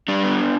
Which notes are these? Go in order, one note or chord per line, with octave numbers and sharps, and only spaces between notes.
G3 D4
B3